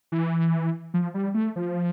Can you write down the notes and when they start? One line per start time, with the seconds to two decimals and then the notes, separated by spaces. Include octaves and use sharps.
0.12 E3
0.94 F3
1.14 G3
1.34 A3
1.56 F3